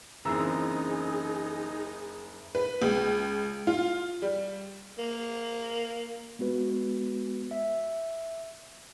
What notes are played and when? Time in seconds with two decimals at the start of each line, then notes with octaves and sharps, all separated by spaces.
0.25 F#1 C#3 E3 C4 D#4 G#4 A#5 E6
2.55 B4
2.82 C#2
3.67 F4
4.22 G3
4.98 A#3
6.39 G#3 B3 F#4 B4
7.51 E5